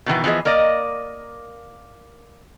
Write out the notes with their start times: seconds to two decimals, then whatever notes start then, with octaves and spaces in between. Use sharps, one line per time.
0.06 B2 D#3 E3 B3
0.24 E3 F3 B3 G#4 D#5
0.45 A#3 A#4 D5 D#5